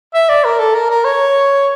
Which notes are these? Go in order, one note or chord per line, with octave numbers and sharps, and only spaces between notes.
E5
D5
A#4
A4
A#4
A#4
C#5